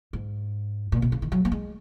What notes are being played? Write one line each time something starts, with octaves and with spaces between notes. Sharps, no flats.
G#2
A#2
B2
C#3
D#3
F#3
A#3
G#3